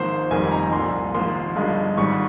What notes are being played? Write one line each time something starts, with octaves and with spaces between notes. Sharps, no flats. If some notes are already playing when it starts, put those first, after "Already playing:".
Already playing: G#1 G#2 F3 A#3 C5
F1 F2 D#3 G3 A#3 G#5
A#5
C2 A#2 F3 C6
G#1 G#2 F3 A#3 C6
G1 G2 F3 G#3
G#1 G#2 G3 C#6